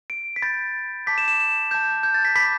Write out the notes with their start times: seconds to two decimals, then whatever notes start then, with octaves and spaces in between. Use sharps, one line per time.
0.10 D7
0.36 B6
0.42 B5 G6 A6
1.07 A5 D6 G6 B6
1.18 E7
1.28 E7
1.71 A5 G6
2.03 G6
2.14 A6
2.25 B6
2.35 B5 D6 G6 B6